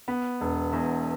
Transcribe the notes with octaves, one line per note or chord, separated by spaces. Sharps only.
B3
E1
E2